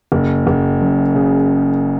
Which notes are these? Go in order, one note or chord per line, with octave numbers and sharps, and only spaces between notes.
F#1
F#1
F#2
C#3